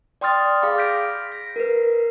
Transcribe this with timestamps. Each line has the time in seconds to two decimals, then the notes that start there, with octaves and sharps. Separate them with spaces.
0.21 D5 G5 C6 D#6 F6 A6
0.62 G#4 F5 B5 D6
0.78 F6 G6 A#6 B6 D7
1.32 A#6
1.56 A#4 B4